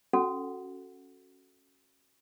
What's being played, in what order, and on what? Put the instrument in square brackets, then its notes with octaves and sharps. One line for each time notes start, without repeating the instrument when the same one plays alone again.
[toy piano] C#4 F#4 A4 F#5